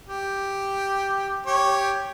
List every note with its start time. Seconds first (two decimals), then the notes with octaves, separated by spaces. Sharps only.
0.07 G4
1.47 G4 C#5